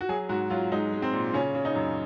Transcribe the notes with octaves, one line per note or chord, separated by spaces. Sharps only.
F#4
F#3 G#4
G#2 F#4
F#3 F4
G#3 D#4
G#3
C4
A#2
C#3 C#4
C#3
D#4
F#2